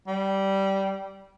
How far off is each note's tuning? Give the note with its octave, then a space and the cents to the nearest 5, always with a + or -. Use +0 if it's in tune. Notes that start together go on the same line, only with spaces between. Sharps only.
G3 -15